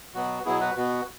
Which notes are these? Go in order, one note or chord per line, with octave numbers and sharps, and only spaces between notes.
B2 F#3 B3 F#4
B2 F#3 B3 E4 G#4
F#4 B4
B2 B3 F#4